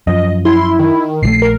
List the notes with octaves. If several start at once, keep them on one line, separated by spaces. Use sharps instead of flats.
F#2 F3 D#5
E4 C6
D#3
A#1 E3 A3 C7
A#4